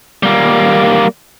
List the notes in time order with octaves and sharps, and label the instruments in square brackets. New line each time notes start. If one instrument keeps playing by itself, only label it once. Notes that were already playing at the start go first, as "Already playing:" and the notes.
[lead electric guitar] G3 A#3